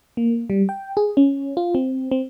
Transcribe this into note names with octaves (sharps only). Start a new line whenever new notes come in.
A#3
G3
G5
G#4
C#4
F4
C4
C4